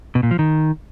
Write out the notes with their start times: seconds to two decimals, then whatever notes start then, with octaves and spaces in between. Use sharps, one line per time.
0.15 B2
0.23 A#2
0.31 F3
0.39 D#3